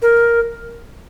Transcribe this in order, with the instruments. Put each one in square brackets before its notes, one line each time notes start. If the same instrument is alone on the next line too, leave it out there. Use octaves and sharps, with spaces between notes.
[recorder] A#4